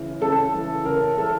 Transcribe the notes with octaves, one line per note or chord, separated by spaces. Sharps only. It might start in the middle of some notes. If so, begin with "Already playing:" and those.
Already playing: C#3 E3
C#3 A4
E3
C#3 A#4
E3 A4